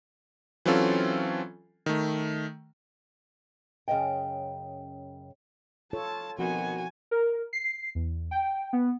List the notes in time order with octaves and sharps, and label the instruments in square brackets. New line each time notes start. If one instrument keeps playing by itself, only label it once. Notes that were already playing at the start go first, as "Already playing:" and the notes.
[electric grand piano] E3 F#3 C4 C#4 F4 A4
D#3 A3
[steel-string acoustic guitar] F#2 C#3 C#5 D#5 G5
[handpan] F4 A4 C#5 [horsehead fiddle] A5
[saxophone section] B2 D#3 F#4 [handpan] F3 C4 [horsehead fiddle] G#5
[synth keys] A#4
C7
E2
G5
B3